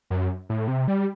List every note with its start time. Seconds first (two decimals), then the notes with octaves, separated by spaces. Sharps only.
0.10 F#2
0.49 A2
0.68 C3
0.88 G3